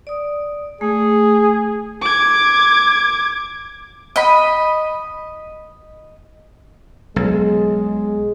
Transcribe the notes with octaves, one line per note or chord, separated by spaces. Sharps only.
D5 D#6
A3 G#4
D6 G#6
D#5 B5
B1 G#3